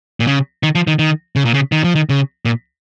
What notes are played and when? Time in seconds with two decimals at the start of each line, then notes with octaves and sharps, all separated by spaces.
0.20 A#2
0.27 C#3
0.63 D#3
0.75 F3
0.87 D#3
0.99 D#3
1.36 C#3
1.45 A#2
1.54 C#3
1.72 D#3
1.84 F3
1.95 D#3
2.09 C#3
2.45 A#2